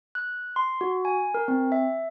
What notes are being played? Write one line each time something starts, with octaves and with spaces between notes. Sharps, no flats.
F#6
C6
F#4
G#5
A#4
C4
E5